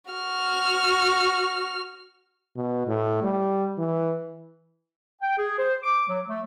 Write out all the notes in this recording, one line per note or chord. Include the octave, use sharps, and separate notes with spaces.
F#4 F6
B2
A2
G3
E3
G5
G#4
C5
D6
F#3
A3